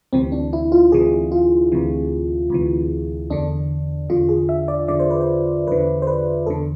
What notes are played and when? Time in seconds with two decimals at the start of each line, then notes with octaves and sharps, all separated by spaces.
0.13 D2 C3 E3 C4
0.32 D4
0.53 E4
0.72 F4
0.92 D2 C3 E3 G#4
1.32 F4
1.72 D2 C3 E3
2.50 D2 C3 E3
3.30 E2 D3 D4
4.09 E2 D3 F4
4.29 G#4
4.49 E5
4.68 D5
4.88 E2 D3 D5
5.00 C5
5.11 B4
5.21 C5
5.67 E2 D3 B4
6.02 C5
6.07 B4
6.46 E2 D3 A4